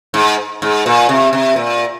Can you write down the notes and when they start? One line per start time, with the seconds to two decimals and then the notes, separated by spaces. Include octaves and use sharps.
0.14 G#2
0.62 G#2
0.86 A#2
1.09 C3
1.33 C3
1.56 A#2